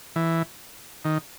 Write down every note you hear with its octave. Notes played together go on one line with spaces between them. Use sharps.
E3
D#3